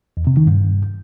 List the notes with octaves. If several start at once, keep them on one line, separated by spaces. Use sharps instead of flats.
E2
C3
D#3
G2